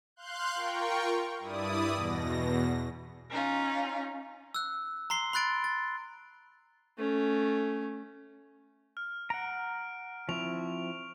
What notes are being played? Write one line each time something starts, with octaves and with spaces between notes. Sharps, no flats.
F5 C6 F#6 G6
F4 A#4 G5 C#6
G2 E4 D5 D#6
E2 B2 A#6
C#4 D#4 F4
E6 F#6
A#5 C6 C7 G7
B5 C6 F#6 A6 D7
A6
A3 C#4
F6
F#5 A#5 D7
F3 C4 E4 C#6 D7 F7